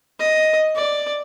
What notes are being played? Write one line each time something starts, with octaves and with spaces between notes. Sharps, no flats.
D#5
D5